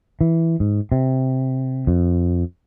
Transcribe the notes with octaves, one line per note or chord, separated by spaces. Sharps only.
E3
G#2
C3
F2